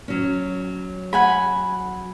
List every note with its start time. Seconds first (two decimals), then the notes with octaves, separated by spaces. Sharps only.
0.08 F#3 C#4
1.13 F#5 G#5 B5